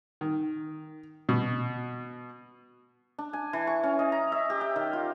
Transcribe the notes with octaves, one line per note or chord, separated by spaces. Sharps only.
D#3
B2
D4
G#5
E3
C#6
C#4
D#5
A#5
E5
G4
G5
D#3
F4